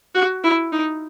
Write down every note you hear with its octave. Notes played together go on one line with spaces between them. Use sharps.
F#4
E4
D#4